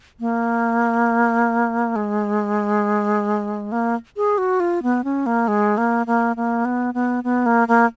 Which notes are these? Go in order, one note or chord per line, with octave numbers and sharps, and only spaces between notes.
A#3
G#3
A#3
G#4
F#4
F4
B3
C#4
A#3
G#3
A#3
A#3
A#3
B3
B3
B3
A#3
A#3